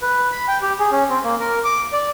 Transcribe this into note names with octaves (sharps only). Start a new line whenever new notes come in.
B4
B5
G5
G4
G#4
C#4
C4
A#3
A#4
D6
D5